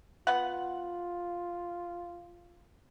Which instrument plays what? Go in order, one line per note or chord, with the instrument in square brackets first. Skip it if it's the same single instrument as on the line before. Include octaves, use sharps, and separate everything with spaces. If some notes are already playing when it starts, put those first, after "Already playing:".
[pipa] B3 B4 F#5 [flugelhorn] F4